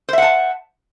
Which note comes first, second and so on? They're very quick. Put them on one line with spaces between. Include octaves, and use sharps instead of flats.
C5 E5 F#5 A5